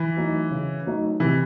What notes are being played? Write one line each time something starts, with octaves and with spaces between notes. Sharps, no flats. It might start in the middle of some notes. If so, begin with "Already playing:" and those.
Already playing: E3
F#3 A3 D#4
C#3
F#3 A3 D#4
C3 E3